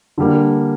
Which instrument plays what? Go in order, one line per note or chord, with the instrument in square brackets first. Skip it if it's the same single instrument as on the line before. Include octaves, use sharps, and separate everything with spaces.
[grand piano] D3 G3 A#3